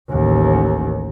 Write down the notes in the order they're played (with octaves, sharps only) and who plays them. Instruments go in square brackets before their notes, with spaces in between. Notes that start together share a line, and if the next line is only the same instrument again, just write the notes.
[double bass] A1 D#2